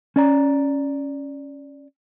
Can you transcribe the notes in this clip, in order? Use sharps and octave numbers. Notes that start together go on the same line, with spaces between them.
C#4 D5 A#5